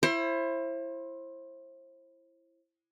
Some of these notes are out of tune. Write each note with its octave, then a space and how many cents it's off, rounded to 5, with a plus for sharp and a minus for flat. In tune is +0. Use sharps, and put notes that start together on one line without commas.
E4 +20 C5 +35